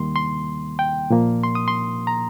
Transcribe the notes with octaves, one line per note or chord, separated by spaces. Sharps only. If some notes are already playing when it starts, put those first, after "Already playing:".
Already playing: D#2 D#3 G3 A#3 C6
C6
G5
A#2 F3 A#3
C6
D#6
C6
A#5